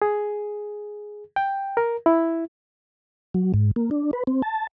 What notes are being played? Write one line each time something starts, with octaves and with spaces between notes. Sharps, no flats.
G#4
G5
A#4
E4
F#3
G#2
A#3
D4
B4
C4
A5